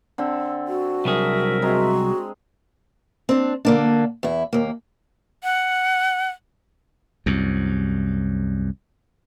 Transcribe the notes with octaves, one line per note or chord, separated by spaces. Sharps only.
D3 C4 A4
F#4
C2 F#3 G#4 A#4 E5
G#3 C4 F#4 A#5
C4 D4
D3 A#3 D4
E2 E4
D#2 A#3
F#5
C2 F#2